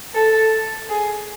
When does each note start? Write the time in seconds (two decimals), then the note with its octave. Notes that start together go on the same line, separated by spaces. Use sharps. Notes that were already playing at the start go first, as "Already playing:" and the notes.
0.14 A4
0.89 G#4